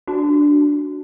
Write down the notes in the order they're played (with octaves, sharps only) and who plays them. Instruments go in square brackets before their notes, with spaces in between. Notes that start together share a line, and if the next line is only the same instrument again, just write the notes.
[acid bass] D4 [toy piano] F#4